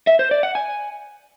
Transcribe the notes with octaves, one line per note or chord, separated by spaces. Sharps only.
E5
C5
D5
F#5
G#5